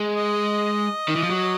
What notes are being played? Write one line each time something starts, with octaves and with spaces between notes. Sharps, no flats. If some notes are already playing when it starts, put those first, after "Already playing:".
Already playing: G#3
D#5
D#3
E3
F3
F#3